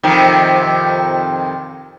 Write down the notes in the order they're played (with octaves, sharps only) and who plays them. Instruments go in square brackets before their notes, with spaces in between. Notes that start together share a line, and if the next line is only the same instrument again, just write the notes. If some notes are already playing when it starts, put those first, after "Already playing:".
[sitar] F2 C3 D#3